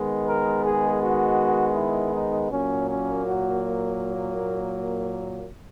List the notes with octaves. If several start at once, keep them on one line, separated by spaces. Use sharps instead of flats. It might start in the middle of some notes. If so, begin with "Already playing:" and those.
Already playing: D#3 G#3 B3
A#4
G#4
F#4
E4
D#4
A#2 F#3 A#3 C#4
C#4
F#4